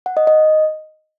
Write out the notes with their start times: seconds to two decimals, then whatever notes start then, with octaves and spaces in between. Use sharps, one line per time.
0.06 F#5
0.17 D#5
0.27 D#5